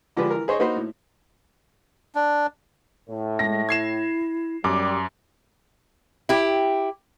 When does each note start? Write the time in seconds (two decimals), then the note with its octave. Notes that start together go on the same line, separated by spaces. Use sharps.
0.17 D3 F3 G#3 D4 G4 B4
0.31 E3 A#4
0.48 G#4 C5 C#5 D#5
0.59 A#3 D#4 F#4 B4 C5
0.76 A2
2.15 D4
3.09 A2
3.39 G#3 A#6
3.69 E4 G#6 C7 E7
4.64 F#2 G3 D6
6.29 E4 G4